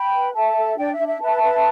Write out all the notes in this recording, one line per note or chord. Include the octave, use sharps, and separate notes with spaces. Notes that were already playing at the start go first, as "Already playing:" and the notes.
Already playing: G5 B5
B4
A4 E5 A5
A4
D4 D5 G5
E5
D4
E5
B4 E5 A5
B4